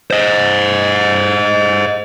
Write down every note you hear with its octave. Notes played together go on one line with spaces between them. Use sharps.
C5 D#5